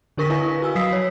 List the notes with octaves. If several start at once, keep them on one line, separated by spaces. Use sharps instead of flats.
D3 D4 A#4 C#6 A#6 B6
E4 B4 D#5 F5 G#5
F#4 G#5 E6
F#3 F5 D#6 B6 C7
C#5